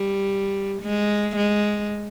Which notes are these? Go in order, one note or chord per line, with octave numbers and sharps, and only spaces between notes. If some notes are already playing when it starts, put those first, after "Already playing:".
Already playing: G3
G#3
G#3